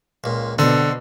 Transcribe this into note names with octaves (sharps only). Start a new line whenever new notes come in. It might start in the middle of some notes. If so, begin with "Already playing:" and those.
C#2 A#2
B2 D3 C4 D5